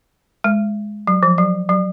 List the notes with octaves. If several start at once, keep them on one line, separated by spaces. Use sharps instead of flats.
G#3
F#3
F3
F#3
F#3